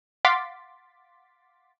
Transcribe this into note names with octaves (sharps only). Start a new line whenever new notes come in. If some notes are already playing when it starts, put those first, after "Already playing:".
F5 F#5 C6 D6 A6 B6